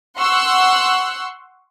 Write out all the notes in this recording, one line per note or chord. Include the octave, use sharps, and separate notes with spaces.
F#5 C6 C#6 E6 F#6